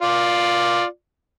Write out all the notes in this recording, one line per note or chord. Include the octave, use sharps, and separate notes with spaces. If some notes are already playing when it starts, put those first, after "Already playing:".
F4 D5